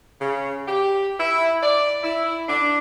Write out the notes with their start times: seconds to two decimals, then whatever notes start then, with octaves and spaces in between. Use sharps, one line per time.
0.20 C#3
0.67 G4
1.19 E4
1.62 D5
2.04 E4
2.48 D4